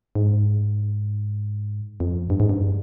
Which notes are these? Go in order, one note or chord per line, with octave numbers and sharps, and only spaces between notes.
G#2
F2
G2
G#2
G2